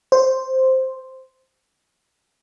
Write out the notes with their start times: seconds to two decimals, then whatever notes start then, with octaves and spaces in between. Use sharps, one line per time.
0.12 C5